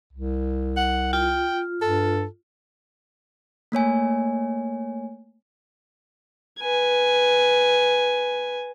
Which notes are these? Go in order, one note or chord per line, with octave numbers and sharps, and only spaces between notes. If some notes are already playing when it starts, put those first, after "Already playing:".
C2
F#5
F4 G5
G2 A4
A3 A#3 C#5 G#5
B4 G#5